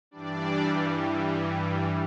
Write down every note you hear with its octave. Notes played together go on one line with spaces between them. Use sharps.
G2 E3 G3 D4 D5